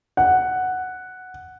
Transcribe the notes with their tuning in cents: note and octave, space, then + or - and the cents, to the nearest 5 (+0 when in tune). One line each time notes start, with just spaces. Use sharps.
F#5 +0